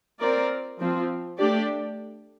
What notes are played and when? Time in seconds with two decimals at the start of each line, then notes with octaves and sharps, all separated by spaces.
0.20 C4 F4 A#4 D5
0.79 F3 C4 F4
1.38 A3 D4 G4 D5